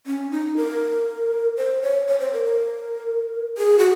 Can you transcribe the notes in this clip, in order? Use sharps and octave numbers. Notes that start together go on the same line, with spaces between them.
C#4
D#4
A#4
C5
C#5
C#5
C5
A#4
A#4
G#4
F#4